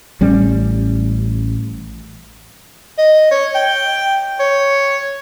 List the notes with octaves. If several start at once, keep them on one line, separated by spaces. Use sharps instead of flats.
A1 G3 C#4
D#5
C#5
G5
C#5